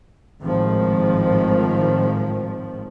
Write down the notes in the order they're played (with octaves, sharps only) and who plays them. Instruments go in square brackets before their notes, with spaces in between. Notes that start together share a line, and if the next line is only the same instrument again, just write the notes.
[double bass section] G#1 A2 D#3 F3